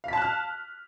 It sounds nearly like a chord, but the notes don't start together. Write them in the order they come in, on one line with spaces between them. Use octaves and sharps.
F5 B6 A5 F#6 F6